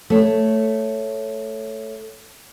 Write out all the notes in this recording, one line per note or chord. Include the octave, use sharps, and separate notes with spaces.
A3 C#5